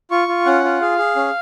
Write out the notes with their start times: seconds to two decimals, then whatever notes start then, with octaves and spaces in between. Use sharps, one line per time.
0.11 F4 C#6
0.28 F4
0.46 C#4 F#5
0.64 F4
0.81 G#4 F5
0.98 G#4
1.16 C#4